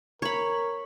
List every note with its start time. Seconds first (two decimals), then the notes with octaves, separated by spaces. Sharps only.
0.22 A#4 C#5 B5